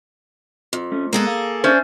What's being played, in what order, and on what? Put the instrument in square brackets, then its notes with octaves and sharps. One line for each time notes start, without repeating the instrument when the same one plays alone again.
[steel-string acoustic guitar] F2
[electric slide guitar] A3 C#4
[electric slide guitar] G#3 B3 [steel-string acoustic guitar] A#3 G#4 A4
[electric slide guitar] F5
[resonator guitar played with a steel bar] C#4 D4 C5 [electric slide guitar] E5